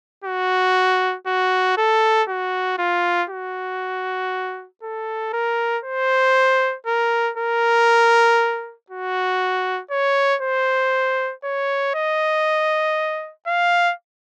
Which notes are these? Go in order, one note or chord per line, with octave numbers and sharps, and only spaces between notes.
F#4
F#4
A4
F#4
F4
F#4
A4
A#4
C5
A#4
A#4
F#4
C#5
C5
C#5
D#5
F5